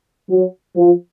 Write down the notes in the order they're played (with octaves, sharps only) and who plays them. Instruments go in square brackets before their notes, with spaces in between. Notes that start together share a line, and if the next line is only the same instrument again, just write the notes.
[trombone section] F#3
F3